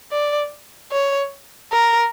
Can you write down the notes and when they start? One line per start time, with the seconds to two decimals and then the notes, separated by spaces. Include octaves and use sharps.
0.11 D5
0.91 C#5
1.72 A#4